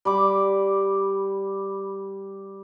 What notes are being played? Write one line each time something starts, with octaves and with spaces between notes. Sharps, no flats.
G3 B5 D6